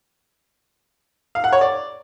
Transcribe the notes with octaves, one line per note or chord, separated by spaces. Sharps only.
F5
F#5
C#5
D5